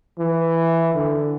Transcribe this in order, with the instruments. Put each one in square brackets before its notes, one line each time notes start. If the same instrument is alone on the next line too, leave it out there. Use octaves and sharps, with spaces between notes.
[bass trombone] E3
D3